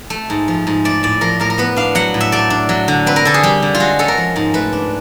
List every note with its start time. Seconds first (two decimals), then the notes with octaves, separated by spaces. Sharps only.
0.10 A3
0.30 G#2
0.48 F3
0.67 G#2
0.85 A3 D5
1.03 A2 D5
1.21 F3 A#4
1.40 A2 A#4
1.50 A#4
1.58 B3 B4
1.76 D4 F5
1.95 F#3 F#5
2.14 A2
2.21 E5
2.32 A3 D5
2.50 D4
2.69 F#3
2.88 D3
3.06 C4 B4
3.16 A#4
3.25 D3 A4
3.34 G#4
3.43 G3 G4
3.62 D3
3.74 F4
3.80 G#3 F#4
3.99 C#4 A4
4.08 A#4
4.17 F3
4.36 G#2
4.54 A3 B4
4.73 D4